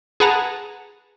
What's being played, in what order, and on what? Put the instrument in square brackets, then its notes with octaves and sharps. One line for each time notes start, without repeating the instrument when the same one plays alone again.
[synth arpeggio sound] G#4 B4 F#5 A5 A#5